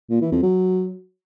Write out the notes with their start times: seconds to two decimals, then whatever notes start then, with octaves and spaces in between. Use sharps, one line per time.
0.10 A#2
0.21 E3
0.32 F2
0.43 F#3